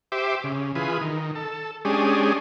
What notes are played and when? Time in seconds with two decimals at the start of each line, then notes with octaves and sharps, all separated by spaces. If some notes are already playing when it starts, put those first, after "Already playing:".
0.12 G4 C5 E5 D6
0.44 C#3
0.75 E3 F4 G#4 B4
1.01 D#3
1.35 A4
1.85 G#3 C#4 D4 G4 G#4